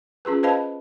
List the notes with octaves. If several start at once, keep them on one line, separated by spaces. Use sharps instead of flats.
C#4 F4 G#4 B4
B4 C5 D#5 F5 A5 B5